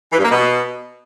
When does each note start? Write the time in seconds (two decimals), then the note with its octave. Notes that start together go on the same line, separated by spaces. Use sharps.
0.12 E3
0.18 G2
0.24 A#3
0.30 B2